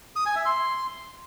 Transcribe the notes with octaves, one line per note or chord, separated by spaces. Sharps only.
D#6
G#5
E5
C6